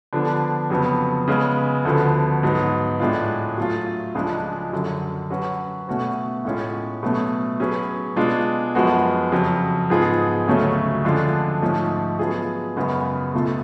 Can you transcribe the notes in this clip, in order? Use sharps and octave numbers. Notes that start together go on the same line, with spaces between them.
D3 F3 B3 D4
F2 C#3 F#3 B3
C#3 G#3 B3
D2 D3 F3 B3
G#2 F#3 B3
A2 G#3 D4 F4
F#3 A3 F4
C#2 C#3 F3 G#3 D4
F#2 D3 F#3
F#3 C#4 F#4 B4
B2 A3 C#4 F#4 B4
A2 G#3 C#4 F4
B2 F#3 A3
F#3 C#4 G#4 B4
B2 G#3 D4 F4
F#2 F3 G#3 B3 F#4
F2 C#3 F#3
G#2 F3 B3 F4 G#4
D2 C#3 F#3 A3 C#4
F2 D3 G#3 D4 F4
G#2 F3 A3 C#4
F#3 B3 F4 G#4
F#2 C#3 G#3 B3 F#4
C#2 B2 A3 F4 A4